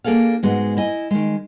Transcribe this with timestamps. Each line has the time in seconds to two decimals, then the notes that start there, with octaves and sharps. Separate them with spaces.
0.04 A#3 D4 G#4 A4 F5
0.43 G#2 G#3 B3 F#4
0.77 E4 D#5 G#5
1.11 D#3 G#3